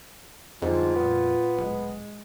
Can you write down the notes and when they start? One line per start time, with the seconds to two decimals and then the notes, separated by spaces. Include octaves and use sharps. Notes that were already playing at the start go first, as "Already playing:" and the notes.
0.62 F2 G#2 D3 G3 F4
0.96 A#2 B3
1.57 D1 G#3